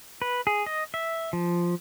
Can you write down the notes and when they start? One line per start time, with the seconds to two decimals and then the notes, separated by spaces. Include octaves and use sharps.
0.22 B4
0.47 G#4
0.66 D#5
0.94 E5
1.33 F3